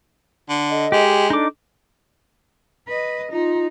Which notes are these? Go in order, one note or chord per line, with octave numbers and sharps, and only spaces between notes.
D3
A4 D#5
G#3 G4
D4 D#4 A4 D6
B4 D#5
D#4 F4